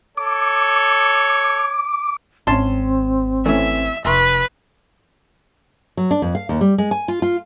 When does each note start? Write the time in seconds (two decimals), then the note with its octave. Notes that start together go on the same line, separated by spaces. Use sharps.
0.17 A4 C#5 D6
2.47 G#1 C4 C#4 A5 C6
3.45 E3 A3 C#4 E5
4.05 F1 B4 E5 C6 C#6
5.97 F#3
6.11 D4
6.22 F2
6.35 F5
6.49 D#2
6.61 G3
6.78 G#3
6.91 G#5
7.08 F4
7.22 F4